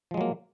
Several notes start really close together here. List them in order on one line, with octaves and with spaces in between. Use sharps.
F3 G#3 F#3 A#3